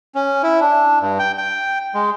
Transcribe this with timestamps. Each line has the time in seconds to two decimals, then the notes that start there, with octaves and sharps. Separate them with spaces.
0.15 C#4
0.43 E4
0.61 D4
1.01 G2
1.19 G5
1.38 G5
1.94 G#3